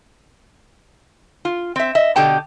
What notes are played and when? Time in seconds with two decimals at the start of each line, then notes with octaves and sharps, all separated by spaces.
1.45 F4
1.76 C4 E5
1.95 D#5 E5
2.16 B2 D3 G4 G5 A5